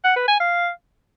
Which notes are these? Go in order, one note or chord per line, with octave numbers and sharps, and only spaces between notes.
F#5
B4
G#5
F5